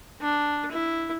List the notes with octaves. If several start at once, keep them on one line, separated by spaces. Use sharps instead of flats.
D4
E4